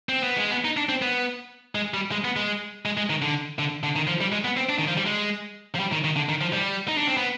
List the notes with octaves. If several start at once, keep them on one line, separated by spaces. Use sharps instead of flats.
C4
B3
G#3
B3
D#4
D4
C4
B3
G#3
G3
G#3
B3
G#3
G#3
G#3
D#3
D3
D3
D3
D#3
F3
G3
G#3
B3
C4
D4
D#3
F3
G3
G#3
F3
G3
D#3
D#3
D3
D#3
F3
G3
D#4
D4
C4
B3